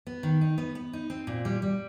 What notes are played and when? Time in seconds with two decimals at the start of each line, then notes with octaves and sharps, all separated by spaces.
0.07 B3
0.23 D#3
0.41 D#4
0.58 B3
0.75 B3
0.93 D#4
1.10 C4
1.27 A#2
1.45 G3
1.62 G3